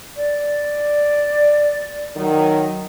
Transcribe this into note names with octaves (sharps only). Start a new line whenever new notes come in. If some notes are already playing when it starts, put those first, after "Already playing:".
D5
D#3 F#3